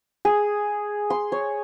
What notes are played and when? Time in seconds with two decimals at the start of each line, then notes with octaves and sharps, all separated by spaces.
0.25 G#4
1.10 C6
1.32 C#5